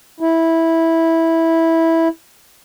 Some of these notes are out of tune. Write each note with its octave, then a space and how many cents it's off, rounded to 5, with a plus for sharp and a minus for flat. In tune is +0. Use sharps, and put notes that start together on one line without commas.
E4 -10